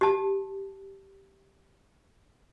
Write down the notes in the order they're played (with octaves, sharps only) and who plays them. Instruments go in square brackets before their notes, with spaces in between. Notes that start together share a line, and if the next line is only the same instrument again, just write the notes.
[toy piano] G4 A5